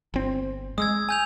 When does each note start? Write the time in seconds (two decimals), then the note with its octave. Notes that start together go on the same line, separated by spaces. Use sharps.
0.14 G1 C4
0.78 G#3 D#6 E6 G#6
1.09 G#5 G6 F7